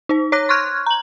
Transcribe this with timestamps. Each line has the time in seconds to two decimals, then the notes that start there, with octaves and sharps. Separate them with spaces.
0.09 D#4 C5
0.32 C#5 D6 F#6 A#6
0.49 C6 C#6 F6 F#6 G#6
0.86 A#5 F#7